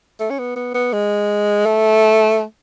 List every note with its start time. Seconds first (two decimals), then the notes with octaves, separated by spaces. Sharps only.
0.20 A3
0.30 C#4
0.39 B3
0.56 B3
0.74 B3
0.93 G#3
1.66 A3